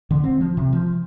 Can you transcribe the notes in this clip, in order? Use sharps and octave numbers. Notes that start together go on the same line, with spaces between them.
D3
C4
F3
C3
F3